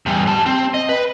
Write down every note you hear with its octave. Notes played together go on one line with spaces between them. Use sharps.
E2 G3
G3 A5
C4
D#5
B4